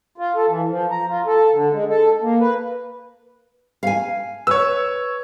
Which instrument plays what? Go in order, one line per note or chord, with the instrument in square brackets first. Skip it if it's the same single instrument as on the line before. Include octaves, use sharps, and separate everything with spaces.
[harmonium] F4
A4
E3
F3
A#5
F4
A4
D3
G#3
A4
A#3
B4
[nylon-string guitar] F5 G#5
[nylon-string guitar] B4 [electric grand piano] C#5 E6